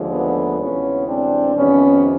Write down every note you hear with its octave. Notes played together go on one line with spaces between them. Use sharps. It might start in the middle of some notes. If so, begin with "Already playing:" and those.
Already playing: D#2 D3 F3 G#3
A3 B3
D2 C3 E3 G#3 B3 C#4
C4 D4
F2 C3 D#3 B3 C#4